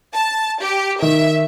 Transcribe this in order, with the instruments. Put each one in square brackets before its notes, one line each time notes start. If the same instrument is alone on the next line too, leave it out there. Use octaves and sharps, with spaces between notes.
[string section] A5
G4
[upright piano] D#3 [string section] E5